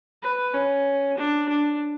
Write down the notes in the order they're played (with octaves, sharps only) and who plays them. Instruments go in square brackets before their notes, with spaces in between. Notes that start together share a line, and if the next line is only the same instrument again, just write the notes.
[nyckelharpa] B4
C#4
D4
D4